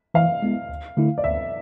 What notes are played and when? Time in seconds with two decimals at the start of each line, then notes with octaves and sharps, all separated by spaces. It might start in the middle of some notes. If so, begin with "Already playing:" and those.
0.14 E3 F5
0.42 G#3 B3 E4
0.69 D2
0.97 D3 A3 E4
1.18 D5
1.24 D2 E5